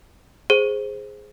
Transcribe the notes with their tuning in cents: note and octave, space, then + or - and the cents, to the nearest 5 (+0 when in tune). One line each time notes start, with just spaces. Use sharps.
G#4 +0 C5 +5